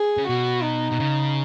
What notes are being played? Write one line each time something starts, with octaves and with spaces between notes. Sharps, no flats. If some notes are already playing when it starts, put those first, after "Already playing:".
Already playing: G#4
C#3
B2 F#4
D#4
B2
C#3